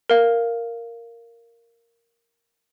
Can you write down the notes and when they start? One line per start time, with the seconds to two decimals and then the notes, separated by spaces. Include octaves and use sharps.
0.10 A#4 F5